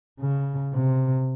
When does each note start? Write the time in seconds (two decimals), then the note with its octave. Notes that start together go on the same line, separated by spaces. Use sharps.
0.20 C#3
0.73 C3